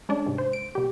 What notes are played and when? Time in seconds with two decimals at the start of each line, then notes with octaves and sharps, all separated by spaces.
0.09 G#3 C#4 D4
0.26 G#2 C3
0.38 C5
0.53 D7
0.75 B2 G4